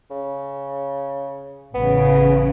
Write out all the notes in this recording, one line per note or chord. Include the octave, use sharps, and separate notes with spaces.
C#3
A1 C#3 B3